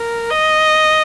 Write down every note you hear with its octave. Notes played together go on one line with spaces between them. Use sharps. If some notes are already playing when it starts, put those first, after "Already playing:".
Already playing: A#4
D#5